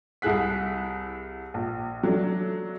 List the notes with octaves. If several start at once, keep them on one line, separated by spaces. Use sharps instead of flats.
C2 E4 G#4 F#6 B6
A#1
F#3 A3 D4